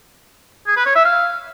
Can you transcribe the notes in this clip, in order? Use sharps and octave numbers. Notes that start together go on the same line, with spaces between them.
G#4
B4
C#5
E5
F5